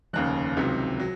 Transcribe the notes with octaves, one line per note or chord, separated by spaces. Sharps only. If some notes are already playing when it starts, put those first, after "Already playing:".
F1 D#2 C#3 F#6
C#2 C3 D#3 F#3
F#3